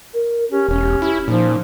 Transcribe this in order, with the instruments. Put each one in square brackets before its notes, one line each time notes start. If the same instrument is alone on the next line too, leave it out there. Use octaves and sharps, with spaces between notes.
[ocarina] A#4
[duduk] C#4 [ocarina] G4
[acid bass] E1 [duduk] C#4
[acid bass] E4
[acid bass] A#2 [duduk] F3 [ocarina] D#4